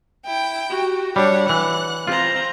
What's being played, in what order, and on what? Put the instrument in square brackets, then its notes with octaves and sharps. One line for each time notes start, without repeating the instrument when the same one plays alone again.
[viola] E4 [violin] G5
[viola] F#4 G4
[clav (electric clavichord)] G3 D4 [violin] C#5 [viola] F#5
[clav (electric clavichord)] E3 [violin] F#6
[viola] C4 A#5 [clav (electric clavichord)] F4